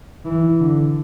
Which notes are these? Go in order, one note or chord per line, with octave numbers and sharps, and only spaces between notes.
E3
D3